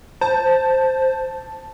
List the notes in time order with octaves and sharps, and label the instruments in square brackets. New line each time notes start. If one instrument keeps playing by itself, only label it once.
[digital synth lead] C5 [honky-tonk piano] A5